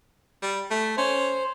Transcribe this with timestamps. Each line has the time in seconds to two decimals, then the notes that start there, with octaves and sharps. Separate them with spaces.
0.42 G3
0.71 A3
0.97 C#4 C5